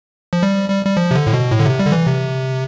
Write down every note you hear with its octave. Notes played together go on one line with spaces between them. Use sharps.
F3
G3
G3
G3
F3
C3
D3
A2
B2
A2
D3
C3
G3
D3
E3
C3